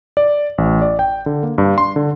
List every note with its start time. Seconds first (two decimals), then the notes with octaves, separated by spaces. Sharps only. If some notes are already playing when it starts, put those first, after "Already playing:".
0.17 D5
0.58 A1
0.82 D5
0.99 G5
1.26 D3
1.43 A#3
1.58 G2
1.78 C6
1.96 D3